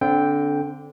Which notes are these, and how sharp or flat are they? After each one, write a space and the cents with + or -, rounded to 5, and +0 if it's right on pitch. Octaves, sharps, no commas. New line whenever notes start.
D3 -15 C4 +0 G5 +0